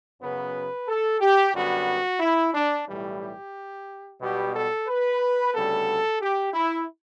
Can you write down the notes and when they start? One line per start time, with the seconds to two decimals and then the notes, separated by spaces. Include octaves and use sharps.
0.20 F#2 C#3 F#3 B3 B4
0.88 A4
1.20 G4
1.54 F#2 D3 G3 B3 F#4
2.20 E4
2.54 D4
2.88 B1 A2 E3 G3
3.20 G4
4.21 B1 B2 G3 B3 G4
4.53 A4
4.87 B4
5.53 D2 C#3 G3 B3 A4
6.21 G4
6.54 E4